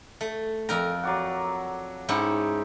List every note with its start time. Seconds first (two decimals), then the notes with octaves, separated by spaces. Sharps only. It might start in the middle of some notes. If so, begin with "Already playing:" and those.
0.21 A3
0.69 F2 A#4 G5 A#5
1.03 F#3 D5 F#5
2.09 G#2 C#4 D#4 E4 G4